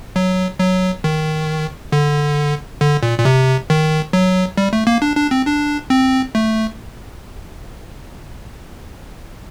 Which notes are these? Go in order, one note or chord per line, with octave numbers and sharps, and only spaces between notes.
F#3
F#3
D#3
D3
D3
A#2
A#2
C3
D#3
F#3
G3
A3
A#3
D4
D4
C4
D4
C4
A3